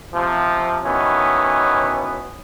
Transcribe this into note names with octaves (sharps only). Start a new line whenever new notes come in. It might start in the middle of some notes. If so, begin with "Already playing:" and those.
C3 F3
B2 D#3 E3 B3 C#4